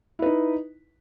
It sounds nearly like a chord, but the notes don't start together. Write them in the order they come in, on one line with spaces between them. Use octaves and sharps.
E4 B4 D#4